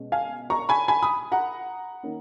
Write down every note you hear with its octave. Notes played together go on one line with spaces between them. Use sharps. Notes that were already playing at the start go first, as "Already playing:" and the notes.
Already playing: B2 G#3 C#4
F5 G#5
A#5 C#6
G#5 B5
G#5 B5
B5 D#6
F#5 A#5
D#3 A#3 C#4